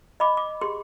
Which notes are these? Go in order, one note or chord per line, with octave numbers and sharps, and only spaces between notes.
D#5 B5 D6
D6
G4 G#4 C6